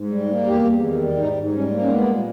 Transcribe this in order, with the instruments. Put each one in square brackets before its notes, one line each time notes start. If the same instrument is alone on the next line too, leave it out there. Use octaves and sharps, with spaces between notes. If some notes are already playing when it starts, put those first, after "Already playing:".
Already playing: [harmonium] G#2
G3
A#3
E2 G4
E2
D#3
G3
G#2 D#4
G#2
G3 C#4
A#3
C#4
G#3 B3
A#2